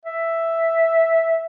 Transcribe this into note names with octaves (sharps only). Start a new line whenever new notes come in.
E5